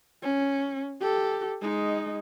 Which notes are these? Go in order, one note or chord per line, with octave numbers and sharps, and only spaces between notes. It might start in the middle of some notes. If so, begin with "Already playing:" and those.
C#4
G4 A4
G#3 D#4